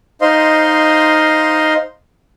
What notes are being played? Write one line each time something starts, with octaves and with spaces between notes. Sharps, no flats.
D#4 C5 D#5 F5 C6